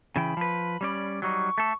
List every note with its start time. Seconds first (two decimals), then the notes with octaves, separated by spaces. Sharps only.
0.16 C#3 E3 G5 B5
0.37 F3 B4
0.81 G3 C#4 D5
1.22 F#3 G3 D#4 C#6
1.58 A3 A4